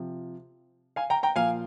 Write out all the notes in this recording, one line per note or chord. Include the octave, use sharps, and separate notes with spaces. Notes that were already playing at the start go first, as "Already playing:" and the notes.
Already playing: C3 F3
F5 G#5
G5 A#5
G5 A#5
A#2 F3 F5 G#5